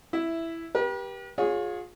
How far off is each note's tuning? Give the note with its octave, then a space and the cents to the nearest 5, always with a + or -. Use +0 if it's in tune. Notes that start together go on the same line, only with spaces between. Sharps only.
E4 +5 E5 +0
G4 +0 B4 -45
F4 +35 G#4 +0 C#5 +0